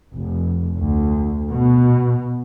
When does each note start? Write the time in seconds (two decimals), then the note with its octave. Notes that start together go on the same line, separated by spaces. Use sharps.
0.13 F1
0.78 D2
1.50 B2